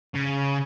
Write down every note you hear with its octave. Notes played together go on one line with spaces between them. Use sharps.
C#3